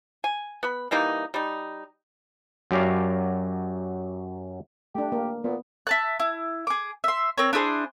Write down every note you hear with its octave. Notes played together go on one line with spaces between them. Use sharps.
G#5
B3 B5
E3 G3 A#3 D#4
G3 D#4
F#2 F#3 G4 D5 F5
A3 D4 G4
A#3
A#2 B3
E5 A5 F#6
E4
G#4 D6
E5 C6
C4 A#4 C#5
D4 E4 G#4 C5